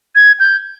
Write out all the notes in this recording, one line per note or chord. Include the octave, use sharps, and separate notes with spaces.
G#6
G6